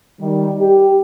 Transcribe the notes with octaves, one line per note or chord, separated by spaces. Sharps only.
D#3 G3
G4